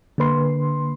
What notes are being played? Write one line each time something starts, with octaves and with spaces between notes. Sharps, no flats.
D3 A#3 B4 C6